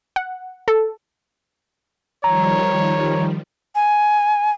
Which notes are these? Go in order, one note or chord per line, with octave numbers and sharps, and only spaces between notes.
F#5
A4
D#3 F3 G3 C#5 A#5
G#5